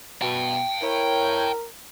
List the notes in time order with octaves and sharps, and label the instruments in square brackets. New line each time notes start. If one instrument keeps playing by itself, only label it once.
[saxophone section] B2 [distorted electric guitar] G5 A5
[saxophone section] E4 C#5 [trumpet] A#4